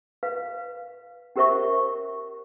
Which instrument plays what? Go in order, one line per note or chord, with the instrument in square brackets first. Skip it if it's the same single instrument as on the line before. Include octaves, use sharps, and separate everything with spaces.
[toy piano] B4 F5
C#4 G4 A#4 C5 E5 C#6